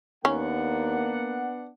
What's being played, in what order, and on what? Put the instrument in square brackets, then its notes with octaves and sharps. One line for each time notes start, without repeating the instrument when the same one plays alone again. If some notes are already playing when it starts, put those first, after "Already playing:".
[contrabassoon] D#2 [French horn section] A#3 [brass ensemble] B3 D4 F#5 [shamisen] C#4